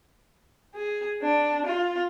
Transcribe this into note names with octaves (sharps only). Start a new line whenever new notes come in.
G#4
D4
F4